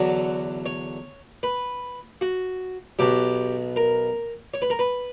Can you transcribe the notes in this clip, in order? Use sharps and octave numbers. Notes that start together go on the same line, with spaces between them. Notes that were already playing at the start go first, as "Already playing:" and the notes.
Already playing: E2 D3 F#3 F#4
C#5
B4
F#4
B1 B2 F#3 G4
A#4
C#5
B4
A#4
B4